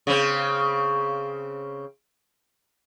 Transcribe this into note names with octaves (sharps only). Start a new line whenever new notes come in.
C#3 C4